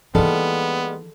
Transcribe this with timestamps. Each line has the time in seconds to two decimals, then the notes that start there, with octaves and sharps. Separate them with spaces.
0.15 E3 G3 G#3 A#3 B3 D#4 A4